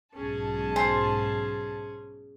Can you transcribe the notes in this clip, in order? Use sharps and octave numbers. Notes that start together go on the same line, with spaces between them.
B1 G#2 C#4 G#4 A5
C5 G#5 C6